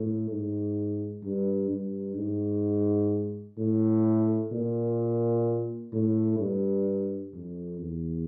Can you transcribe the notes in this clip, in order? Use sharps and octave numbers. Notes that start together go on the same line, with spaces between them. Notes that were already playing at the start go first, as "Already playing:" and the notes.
Already playing: A2
G#2
G2
G2
G#2
A2
A#2
A2
G2
F2
E2